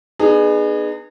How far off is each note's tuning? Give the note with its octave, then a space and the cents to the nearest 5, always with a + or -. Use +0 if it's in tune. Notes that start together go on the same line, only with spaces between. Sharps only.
B3 -5 D#4 -45 G#4 +0